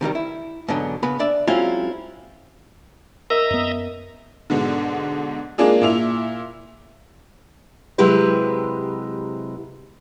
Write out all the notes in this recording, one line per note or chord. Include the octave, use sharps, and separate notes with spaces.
C3 D#3 F3 G3
E4
G#2 B2 D3 F#3
C#3 B3 B4 B5
D4 D5 E5
F#3 G#3 C4 C#4 E4 F4
A#4 D#5 E5 A#5
F#2 B3
G#2 B2 D3
G#3 A#3 D4 F4 G#4
A#2 E4 F7
C3 F#3 G#3 E4 G4 B4